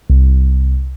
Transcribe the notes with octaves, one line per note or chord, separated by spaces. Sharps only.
C2